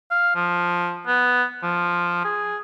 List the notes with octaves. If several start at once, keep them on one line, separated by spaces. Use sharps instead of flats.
F5
F3
B3
F3
G#4